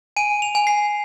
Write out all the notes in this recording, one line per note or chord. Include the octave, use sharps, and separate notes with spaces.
G#5 D#7
F7
G#5
C7